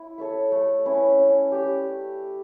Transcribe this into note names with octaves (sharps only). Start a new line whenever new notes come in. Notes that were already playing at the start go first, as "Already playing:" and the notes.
Already playing: E4
A4 C#5 E5
A3
C#4 E4 B4
C#4
G4 D5